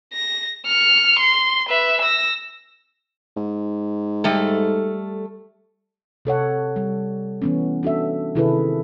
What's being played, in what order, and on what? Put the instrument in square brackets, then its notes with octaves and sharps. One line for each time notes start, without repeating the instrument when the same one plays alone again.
[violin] A#6
F6 C#7
C6
B4 E5
E6 A#6
[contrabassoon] G#2
[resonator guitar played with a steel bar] G3 A3 A4
[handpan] C3 A4 C#5 F#5
G3
E3 B3 C#4
D4 F#4 A4 E5
C3 D#3 E4 G#4 A4 B4